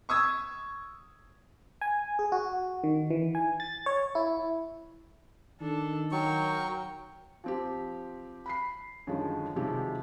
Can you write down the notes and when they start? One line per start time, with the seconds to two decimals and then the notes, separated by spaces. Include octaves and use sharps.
0.09 C#6 D#6 E6 G#6
1.81 G#5
2.19 G#4
2.32 F#4
2.84 D#3
3.11 E3
3.35 G#5
3.60 A6
3.86 C#5
4.15 E4
5.61 D#3 D4 A4
6.12 F#3 A#4 G5 C#6
7.44 F3 C4 G4
8.46 B5 B6 C7
9.07 F#2 D3 D#3 F3 G#3
9.56 C3 D#3 F3 F#3 G#3 G4